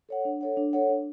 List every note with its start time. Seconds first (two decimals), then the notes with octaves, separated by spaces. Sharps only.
0.09 A4 C#5 F#5
0.25 D4
0.41 A4 C#5 F#5
0.57 D4
0.73 A4 C#5 F#5
0.90 D4